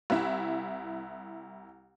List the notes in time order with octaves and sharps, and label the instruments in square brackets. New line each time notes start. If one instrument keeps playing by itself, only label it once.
[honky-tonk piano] C2 E4